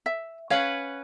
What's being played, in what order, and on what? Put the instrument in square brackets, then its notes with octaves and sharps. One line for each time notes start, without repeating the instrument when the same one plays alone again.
[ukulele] E5
[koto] C#4 B4 F#5 [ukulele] C#5 F5